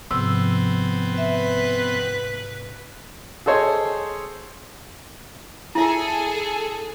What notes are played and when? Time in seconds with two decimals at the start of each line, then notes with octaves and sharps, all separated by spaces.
0.11 G#2 C3 F3 B3 C4 E6
1.18 B4 E5
3.46 G#4 A4 C5 C#5 D#5
5.75 E4 G#4 A4 E5 G#5